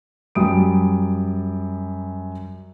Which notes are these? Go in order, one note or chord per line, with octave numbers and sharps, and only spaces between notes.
F#2 G3 D#6 D7